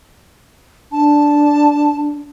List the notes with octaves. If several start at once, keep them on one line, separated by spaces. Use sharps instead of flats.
D4 A5